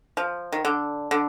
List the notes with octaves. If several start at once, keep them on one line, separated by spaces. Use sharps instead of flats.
F3
D#3
D3
D3